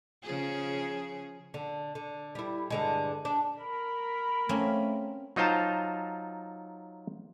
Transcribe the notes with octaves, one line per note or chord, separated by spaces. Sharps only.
C#3 F3 G#4
D3
D3
G3 E4
G2 D3 G#3
D4
A#4 B5
A3 A#3 C4 C#4
F#3 D#4 F4 C5 A5 A#5